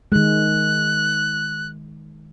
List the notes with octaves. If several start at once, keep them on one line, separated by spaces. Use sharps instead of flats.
D#3 G#3 F#6